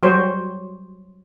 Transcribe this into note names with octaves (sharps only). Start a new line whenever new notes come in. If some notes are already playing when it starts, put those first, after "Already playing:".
F#3 G3 C5 C#5